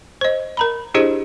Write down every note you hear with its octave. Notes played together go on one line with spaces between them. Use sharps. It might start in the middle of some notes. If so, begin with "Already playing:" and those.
C5 D#5
A#4 A#5 B5
D4 E4 G4 G#4 C5 D#5